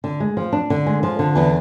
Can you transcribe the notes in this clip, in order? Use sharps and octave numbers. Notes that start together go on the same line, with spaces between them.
D3
G#3
F3
D4
D3
G#3
F3
D3
E2